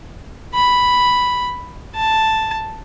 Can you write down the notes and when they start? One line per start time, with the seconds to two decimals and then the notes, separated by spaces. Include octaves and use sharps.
0.55 B5
1.95 A5